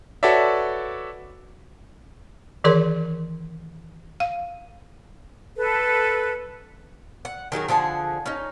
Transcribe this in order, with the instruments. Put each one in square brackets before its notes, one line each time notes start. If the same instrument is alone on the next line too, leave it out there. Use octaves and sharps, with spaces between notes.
[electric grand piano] F#4 A4 B4 C#5 D5 E5
[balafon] D#3 E3 G#4 A#4 C#5 C6
F5
[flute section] A4 B4
[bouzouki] F#5
D#3 F#3 G#4 A#4
D3 F3 G#4 F#5
C#4 D#4